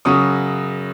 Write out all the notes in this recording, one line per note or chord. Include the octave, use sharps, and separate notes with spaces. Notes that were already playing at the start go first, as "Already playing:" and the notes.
F#2 C#3 F#3 C#6 D#6